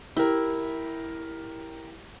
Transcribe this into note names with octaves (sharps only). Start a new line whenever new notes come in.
E4 G4 A#4